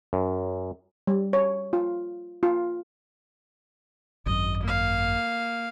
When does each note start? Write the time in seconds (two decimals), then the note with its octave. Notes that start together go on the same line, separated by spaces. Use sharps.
0.13 F#2
1.07 G3
1.33 C#5
1.73 F4
2.43 F4
4.26 G#1 F#2 D#5
4.63 A#3 F5